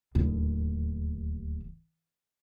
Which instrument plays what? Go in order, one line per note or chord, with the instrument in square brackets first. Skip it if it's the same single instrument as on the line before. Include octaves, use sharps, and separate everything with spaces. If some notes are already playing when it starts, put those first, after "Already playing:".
[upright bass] D1 D#2